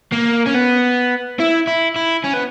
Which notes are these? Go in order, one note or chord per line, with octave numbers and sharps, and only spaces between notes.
A#3
C#4
B3
E4
E4
E4
C#4
B3